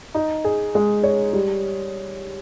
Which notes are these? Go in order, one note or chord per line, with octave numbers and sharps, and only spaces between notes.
D#4
G#4
G#3
C#5
G3